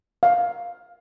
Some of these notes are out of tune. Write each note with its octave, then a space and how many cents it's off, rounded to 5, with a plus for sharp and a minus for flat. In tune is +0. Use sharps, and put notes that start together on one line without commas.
F5 +15